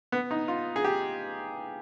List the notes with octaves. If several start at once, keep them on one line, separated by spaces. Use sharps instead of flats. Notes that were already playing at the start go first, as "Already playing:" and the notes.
B3
D#4
F4
G#4
G4